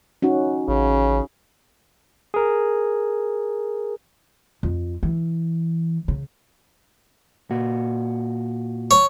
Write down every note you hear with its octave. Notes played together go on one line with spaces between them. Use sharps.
C#4 D#4 F#4
A1 C#3
G#4 A#4
F2
E3
C#3
A#2 F#4
C#5